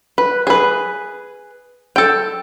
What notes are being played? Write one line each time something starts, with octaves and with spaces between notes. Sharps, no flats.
B4
G#4 B4
A4 G5